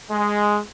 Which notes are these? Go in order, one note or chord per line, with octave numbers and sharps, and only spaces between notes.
G#3